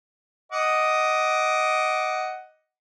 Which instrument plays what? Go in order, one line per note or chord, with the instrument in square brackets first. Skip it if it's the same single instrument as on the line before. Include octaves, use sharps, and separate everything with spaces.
[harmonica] D#5 F#5 D6